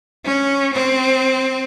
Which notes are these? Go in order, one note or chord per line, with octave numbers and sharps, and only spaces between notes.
C#4
C4